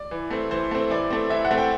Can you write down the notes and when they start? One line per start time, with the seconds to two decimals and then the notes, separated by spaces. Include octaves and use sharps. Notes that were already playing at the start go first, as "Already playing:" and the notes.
Already playing: D5
0.11 E3
0.31 A3 C4
0.51 E3 C5
0.71 A3 C4
0.90 E3 D5
1.10 A3 C4
1.30 E3 E5
1.45 F#5
1.51 A3 C4
1.58 G5